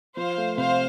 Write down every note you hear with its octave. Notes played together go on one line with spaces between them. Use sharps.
F3 C5 F5
A3
C3 C5 F5